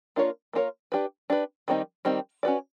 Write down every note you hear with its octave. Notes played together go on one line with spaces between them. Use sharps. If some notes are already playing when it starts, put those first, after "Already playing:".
A#3 D4 F4 A#4 C#5
A#3 D4 F4 A#4 C#5
D4 G4 B4
D4 G4 B4
D#3 G3 C4 D#4
D#3 G3 C4 D#4
C#4 F#4 B4 D5